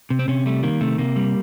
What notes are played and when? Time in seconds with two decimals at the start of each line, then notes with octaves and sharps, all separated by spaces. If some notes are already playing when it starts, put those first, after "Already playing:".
0.10 C3
0.19 C4
0.28 C3 C#4
0.46 G3 A3
0.63 D#3 A#3
0.81 C3 A3
0.98 C3 A#3
1.16 G3